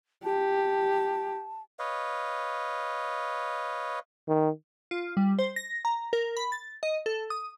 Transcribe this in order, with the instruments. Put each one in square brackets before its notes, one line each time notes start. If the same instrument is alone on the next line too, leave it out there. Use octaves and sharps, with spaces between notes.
[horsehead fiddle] G4 [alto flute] A5
[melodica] B4 C#5 D#5 F5
[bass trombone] D#3
[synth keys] F4
G3
C5
A#6
A#5
A#4
B5
A6
D#5
A4
D#6